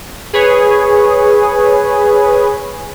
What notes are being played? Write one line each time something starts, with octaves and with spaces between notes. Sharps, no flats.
G#4 B4 C#5 G#5